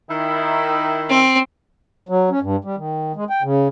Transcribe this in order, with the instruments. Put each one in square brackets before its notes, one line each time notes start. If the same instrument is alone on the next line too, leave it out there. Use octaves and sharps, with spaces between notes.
[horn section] D#3 E4
[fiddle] C4
[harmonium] F#3
C#4
G2
G3
D#3
G#3
G5
C#3